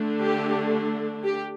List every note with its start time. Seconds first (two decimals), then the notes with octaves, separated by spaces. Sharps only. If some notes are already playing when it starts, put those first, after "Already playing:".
Already playing: D3 A3 D4
0.21 G4
1.24 G4